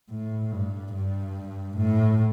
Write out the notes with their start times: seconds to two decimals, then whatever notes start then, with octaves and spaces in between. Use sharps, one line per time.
0.10 A2
0.52 G2
0.94 G2
1.78 A2